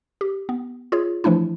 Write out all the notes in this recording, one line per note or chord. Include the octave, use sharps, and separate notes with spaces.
G4
B3
F4 G#4 C#5
E3 F3 A3 D4 E4